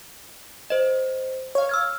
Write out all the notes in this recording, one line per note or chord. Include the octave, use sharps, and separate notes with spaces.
C5 D#5
C#5 F5
E6 F6 G#6